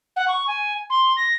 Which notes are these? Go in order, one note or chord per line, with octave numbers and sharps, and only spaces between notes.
F#5
C#6
G#5
C6
A#6